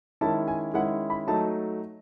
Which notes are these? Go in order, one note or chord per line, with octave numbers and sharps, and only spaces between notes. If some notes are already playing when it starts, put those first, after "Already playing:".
D#3 G#3 C#4 E4 A5
G#5
D#3 G#3 C#4 E4 F#5
B5
F#3 A3 D#4 A5